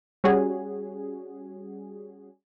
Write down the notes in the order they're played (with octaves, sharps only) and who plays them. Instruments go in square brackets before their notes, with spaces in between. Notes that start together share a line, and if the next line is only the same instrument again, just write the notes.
[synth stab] G3 C#4 F#4 G#4